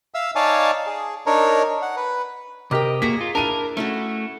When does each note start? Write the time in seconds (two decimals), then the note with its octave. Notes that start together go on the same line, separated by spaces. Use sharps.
0.14 E5 F5 E6
0.35 D#4 C#5 D5 F5 G#5 A5
0.87 G#4
1.26 D4 D#4 A#4 C#5
1.82 F#5
1.97 B4
2.71 C3 G4 A#4 D#5 G5 D6
3.02 A#3 F#4 G#4 A#5 B6
3.21 F4
3.35 D4 E4 A#4 F5 A5 D#7
3.77 A3 C#4 E4 F#4